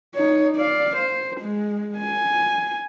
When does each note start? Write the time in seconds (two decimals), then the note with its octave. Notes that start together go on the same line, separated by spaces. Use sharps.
0.15 D#4 C#5
0.56 D5 F5
0.96 C5
1.41 G#3
1.99 G#5